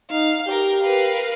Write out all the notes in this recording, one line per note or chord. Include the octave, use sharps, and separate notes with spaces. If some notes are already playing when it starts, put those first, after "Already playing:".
D#4 F5
G4 A#4 G6
A#4 B4 F5